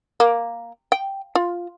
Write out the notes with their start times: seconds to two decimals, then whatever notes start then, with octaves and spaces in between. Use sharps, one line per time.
0.20 A#3
0.92 G5
1.35 F4